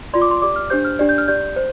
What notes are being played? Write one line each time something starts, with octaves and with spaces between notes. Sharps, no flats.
F4 D5 C6
D6
C6
G4 D5 D6
F6
D4 G4 C5 G6
F6
D4 G4 D5
G6
F6
G4 D5 G6
C5